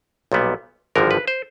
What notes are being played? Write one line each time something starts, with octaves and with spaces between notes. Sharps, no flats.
B1 A#2 G3 B3
G#1 G2 D3 F3 A#4
B4
C5